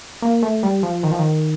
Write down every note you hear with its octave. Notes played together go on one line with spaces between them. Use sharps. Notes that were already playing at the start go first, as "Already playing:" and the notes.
A#3
A3
G3
F3
D#3
F3
D#3